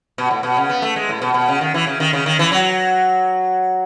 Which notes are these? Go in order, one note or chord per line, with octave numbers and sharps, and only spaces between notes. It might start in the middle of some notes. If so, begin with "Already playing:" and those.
B2
A2
B2
C#3
B3
A3
G#3
A2
B2
B2
C#3
D#3
E3
C#3
D#3
C#3
D#3
E3
F#3